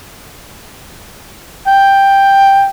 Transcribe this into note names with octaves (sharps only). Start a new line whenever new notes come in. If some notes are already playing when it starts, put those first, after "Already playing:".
G5